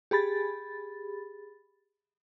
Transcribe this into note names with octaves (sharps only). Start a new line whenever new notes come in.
G4 G#4 B5 A6